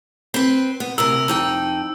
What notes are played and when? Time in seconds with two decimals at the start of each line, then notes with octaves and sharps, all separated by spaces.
0.34 C4 B4
0.80 B3
0.98 D2 C3 A#4 E6
1.28 F2 D#4 G5